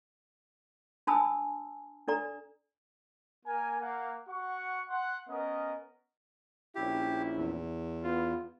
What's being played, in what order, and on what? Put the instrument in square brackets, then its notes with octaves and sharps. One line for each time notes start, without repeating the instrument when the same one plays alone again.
[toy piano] D4 G#5 A5 B5 D#6 E6
D4 A4 D5 A#5
[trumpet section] A#3 A#4 G#5
A#3 F#5
F#4 F#5 C#6
F#5 C6
B3 C#4 A#4 D#5
[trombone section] A#1 C#4 E4 [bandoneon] G4
[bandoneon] E2
[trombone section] B3 F4